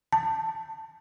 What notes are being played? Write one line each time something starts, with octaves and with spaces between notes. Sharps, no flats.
A5